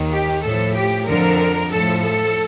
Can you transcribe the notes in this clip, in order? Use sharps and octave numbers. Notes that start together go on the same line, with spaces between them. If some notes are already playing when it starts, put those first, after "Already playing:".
Already playing: D#2 D#3
G4
A2 F3 A4
G4
F2 D3 F3 A#4
A2 F3 A4
A4